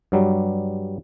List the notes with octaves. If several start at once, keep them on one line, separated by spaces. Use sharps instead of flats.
G2 F#3 G3